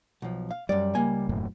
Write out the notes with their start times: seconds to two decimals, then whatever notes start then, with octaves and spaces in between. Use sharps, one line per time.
0.22 B1 F3
0.51 F5
0.69 F#2 G3 D5
0.95 C#2 A#3 G#5
1.29 E1 F#2 A2